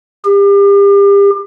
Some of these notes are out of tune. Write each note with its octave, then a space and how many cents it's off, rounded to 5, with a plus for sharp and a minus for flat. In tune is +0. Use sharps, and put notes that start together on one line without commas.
G4 +35